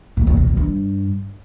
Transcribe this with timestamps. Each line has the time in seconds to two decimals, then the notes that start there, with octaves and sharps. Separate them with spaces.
0.17 A#2
0.27 F2
0.37 B2
0.47 F#2
0.57 G2